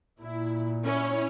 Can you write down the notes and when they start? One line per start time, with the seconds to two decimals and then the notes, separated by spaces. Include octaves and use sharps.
0.21 A#2 E4
0.85 C#4 E4 C#5